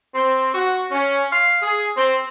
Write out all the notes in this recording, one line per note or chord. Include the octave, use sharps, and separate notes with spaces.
C4
F#4
C#4
F5
G#4
C4